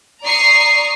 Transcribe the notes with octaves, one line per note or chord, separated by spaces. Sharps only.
D5 A#5 C#6 D#6 C7